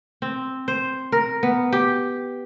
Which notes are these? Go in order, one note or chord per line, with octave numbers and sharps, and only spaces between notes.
C4
C5
A#4
B3
G4